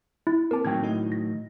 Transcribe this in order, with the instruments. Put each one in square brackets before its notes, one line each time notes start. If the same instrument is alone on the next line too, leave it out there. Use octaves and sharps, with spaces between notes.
[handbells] E4
[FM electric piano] A#3 C4 D6 [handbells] A#4 A5
[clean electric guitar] A2 D#3 F#3 [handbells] G5 G#6
[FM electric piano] A3 E4 D#5
[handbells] A#6